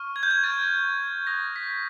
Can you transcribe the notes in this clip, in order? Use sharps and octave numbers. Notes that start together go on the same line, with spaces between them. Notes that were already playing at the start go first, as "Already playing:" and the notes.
Already playing: C#6 F6
G#6
G6
G#6
C#6 F6 A6
D#6 F#6 A#6
B6